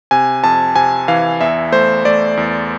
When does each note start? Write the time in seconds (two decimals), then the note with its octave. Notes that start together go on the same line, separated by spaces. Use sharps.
0.11 C3 G#5
0.44 F2 A5
0.76 C3 G#5
1.08 E3 F5
1.41 E2 E5
1.72 A3 C5
2.05 A3 D5
2.37 E2